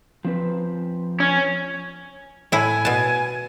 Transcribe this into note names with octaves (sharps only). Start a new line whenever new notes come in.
F3 C4 B4
C#4
A2 E4 G#5
B2 A5